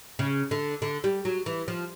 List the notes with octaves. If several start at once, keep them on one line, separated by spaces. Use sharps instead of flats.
C#3
D3
D3
G3
F#3
E3
F3